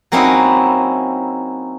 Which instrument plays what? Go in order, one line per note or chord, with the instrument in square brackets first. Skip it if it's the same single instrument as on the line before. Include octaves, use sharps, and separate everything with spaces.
[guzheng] F#3 A#3 C4 C#4 D#4 E4